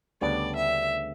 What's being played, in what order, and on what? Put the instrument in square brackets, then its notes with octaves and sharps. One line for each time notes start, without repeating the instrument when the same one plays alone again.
[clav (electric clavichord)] D2 C#3 G3 B3 D4 [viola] D5
[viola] E5